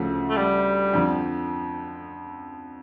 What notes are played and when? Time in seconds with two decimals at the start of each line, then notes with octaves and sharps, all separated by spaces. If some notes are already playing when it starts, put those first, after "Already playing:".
Already playing: D2 C#3 F3 A3
0.29 A3
0.36 G3
0.93 F2 D3 F3